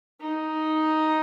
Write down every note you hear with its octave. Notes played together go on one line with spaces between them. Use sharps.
D#4